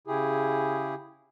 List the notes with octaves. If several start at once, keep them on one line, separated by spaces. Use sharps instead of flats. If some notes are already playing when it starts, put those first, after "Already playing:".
C#3 E4 G4 G#4